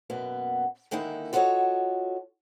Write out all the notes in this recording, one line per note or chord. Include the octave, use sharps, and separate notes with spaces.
F#2 B2 A#3 B3
D3 D#3 G#3 A#3 D#4 E4
F4 F#4 A4 A#4 C#5 D#5